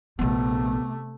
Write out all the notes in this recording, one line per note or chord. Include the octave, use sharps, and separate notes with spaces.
A#1 C3 F3 A3 B3